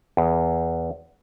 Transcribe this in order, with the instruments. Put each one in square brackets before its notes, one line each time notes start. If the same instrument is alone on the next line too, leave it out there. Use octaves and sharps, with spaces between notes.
[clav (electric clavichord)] E2